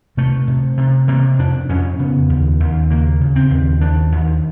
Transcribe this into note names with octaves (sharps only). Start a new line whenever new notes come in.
C3 A3
C3
C3
C3 A#3
F2 D4
F2 C#4
C#3 B3
D#2
D#2
C#3 A#3
C#3
C4
D#2
D#2 D4
D#2